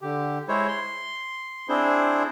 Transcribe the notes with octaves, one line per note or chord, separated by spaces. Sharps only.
D3 G4
G#3 E4 C5 C#5
C6
C4 D4 E4 G#4 C5